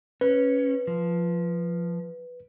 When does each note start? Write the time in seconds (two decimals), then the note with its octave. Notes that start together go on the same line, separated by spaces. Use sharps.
0.21 C#4 B4
0.87 F3